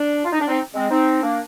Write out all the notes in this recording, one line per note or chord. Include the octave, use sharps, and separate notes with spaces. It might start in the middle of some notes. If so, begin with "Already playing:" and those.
Already playing: D4
F4
D#4
D4
C4 D#4
G#3 C4
C4 D#4
A#3 D4